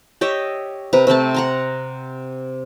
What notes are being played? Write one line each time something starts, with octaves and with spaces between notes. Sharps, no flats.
G4 C#5 D#5 E5
C3 B4 A#5
C3 A3 C4 A5
F#5 A#5 C6